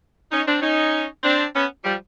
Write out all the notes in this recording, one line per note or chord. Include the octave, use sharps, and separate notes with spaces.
C#4 D#4
C4 D4
C#4 D#4
C4 D4
B3 C#4
F3 G3